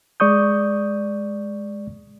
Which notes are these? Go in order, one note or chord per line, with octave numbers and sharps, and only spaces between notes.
G#3 D5 C#6 D#6 G6